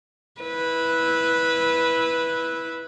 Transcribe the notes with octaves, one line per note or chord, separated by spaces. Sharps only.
E4 B4